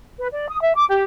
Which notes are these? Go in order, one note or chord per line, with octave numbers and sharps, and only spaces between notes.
B4
D5
D#6
E5
D6
G4